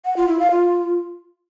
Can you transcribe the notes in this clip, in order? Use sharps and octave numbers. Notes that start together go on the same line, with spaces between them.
F#5
F4
E4
F5
F4